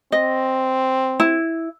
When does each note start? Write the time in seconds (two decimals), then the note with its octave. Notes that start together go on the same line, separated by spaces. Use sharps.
0.12 C4 D#5
1.20 E4